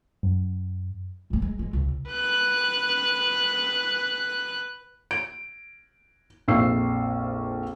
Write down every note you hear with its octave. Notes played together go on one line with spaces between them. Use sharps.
F#2
G2 A3
G#3
D3 G#3
C#2 C#3
B4 F#6
D7
A#1 F2 F5 C#6 E6 C7